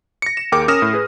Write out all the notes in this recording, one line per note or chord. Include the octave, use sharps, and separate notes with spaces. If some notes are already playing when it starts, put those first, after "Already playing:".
A#6 C#7
E7
D#2 G#4 A#4 G5 D6 C#7
C#4 A#4 D#6 F6 A#6 E7
A2
G#4 B4